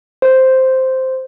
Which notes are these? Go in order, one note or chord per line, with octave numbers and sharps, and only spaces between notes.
C5